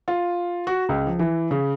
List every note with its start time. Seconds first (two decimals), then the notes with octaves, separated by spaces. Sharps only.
0.08 F4
0.67 F#4
0.89 C#2
1.07 F3
1.19 E3
1.51 C#3